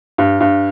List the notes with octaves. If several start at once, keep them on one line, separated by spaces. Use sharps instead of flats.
G2
G2